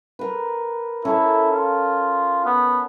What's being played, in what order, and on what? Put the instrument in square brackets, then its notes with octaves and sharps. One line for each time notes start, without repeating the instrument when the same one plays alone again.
[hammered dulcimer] A#4 B4
[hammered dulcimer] C#4 A4 A#4 [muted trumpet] E4
[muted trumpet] F4
B3